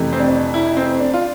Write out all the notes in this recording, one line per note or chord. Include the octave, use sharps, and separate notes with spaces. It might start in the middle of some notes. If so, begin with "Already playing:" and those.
Already playing: F2 C3 E3 A3
C4
D4
E4
C4
D4
F4